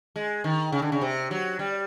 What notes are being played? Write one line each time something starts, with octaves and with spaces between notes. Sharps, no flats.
G#3
D#3
C#3
D3
C#3
C3
F#3
G3